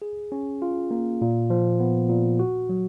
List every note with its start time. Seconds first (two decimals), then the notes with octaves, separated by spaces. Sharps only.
0.02 G#4
0.32 C#4
0.62 F4
0.91 A#3
1.22 A#2
1.50 F3
1.80 B3
2.09 A#2
2.39 F#4
2.69 F#3